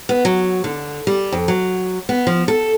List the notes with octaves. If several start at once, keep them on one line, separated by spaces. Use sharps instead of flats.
B3
F#3
D3
G3
F2
F#3
B3
F3
A4